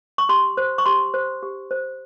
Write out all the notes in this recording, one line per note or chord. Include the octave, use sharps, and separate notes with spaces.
C#6
G4 C6
C5
C#6
G4 C6
C5
G4
C5